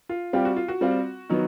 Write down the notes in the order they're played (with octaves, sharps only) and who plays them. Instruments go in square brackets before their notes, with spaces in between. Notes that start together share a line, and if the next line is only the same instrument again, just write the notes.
[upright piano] F4
[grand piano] G3 C4 F4 [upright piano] G4
[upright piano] F#4
F4
F#4
[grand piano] G3 C4 F4
D#3 F#3 B3